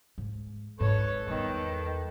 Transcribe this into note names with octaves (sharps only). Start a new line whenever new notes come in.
G#2
G#1 G#2 A4 B4 C#5
E2 D#3 G3